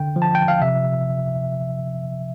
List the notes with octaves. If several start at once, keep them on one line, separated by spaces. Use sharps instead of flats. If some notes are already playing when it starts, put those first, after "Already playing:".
Already playing: D3 G5
F3
A5
G5
F5
C3 E5